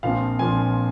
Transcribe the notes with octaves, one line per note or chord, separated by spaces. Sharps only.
A#1 A#2 F3 C4 F5
A#1 A#2 F3 C4 G#5